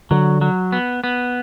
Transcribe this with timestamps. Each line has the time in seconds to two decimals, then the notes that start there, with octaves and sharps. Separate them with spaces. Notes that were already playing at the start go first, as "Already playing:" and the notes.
0.11 D3 F#3
0.41 F#3
0.72 B3
1.04 B3